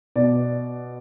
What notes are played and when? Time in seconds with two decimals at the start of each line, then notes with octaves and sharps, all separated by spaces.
0.16 B2 D5